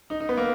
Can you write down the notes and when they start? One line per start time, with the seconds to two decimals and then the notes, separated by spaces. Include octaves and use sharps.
0.10 D#4
0.20 D#4
0.29 B3
0.37 A#3